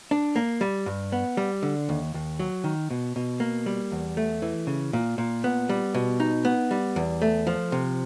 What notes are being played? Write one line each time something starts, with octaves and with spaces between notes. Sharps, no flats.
D4
A#3
G3
G2
B3
G3
D3
D#2
D#2
F#3
D#3
B2
B2
A#3
G3
E2
A3
E3
C#3
A#2
A#2
B3
G3
B2
D#4
B3
G3
E2
A3
F3
C3